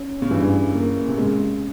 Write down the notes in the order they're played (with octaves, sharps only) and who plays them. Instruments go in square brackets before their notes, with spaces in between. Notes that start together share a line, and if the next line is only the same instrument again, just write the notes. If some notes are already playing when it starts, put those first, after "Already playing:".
Already playing: [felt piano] C#4
[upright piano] C#3
[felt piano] G2 [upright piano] E3
[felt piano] A#3
[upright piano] C3
[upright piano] C#3 [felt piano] G#3